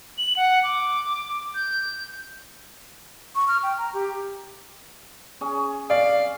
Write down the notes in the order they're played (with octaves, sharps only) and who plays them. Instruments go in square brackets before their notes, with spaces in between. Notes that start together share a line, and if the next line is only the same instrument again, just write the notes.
[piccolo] F#7
F#5
D6
G6
[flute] C#6
F6
G5
A#5
G4
[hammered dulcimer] C#4 G#4
[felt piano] D5 [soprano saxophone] F5